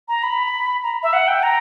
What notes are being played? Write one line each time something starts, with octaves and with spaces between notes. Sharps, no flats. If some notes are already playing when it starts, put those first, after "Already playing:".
A#5
B5
A#5
E5
F#5
G5
A#5